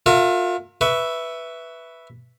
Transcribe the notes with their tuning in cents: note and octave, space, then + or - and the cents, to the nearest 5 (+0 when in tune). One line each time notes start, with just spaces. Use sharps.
F4 +35 A#4 -35 E5 +25
B4 +0 E5 +0 C#6 +20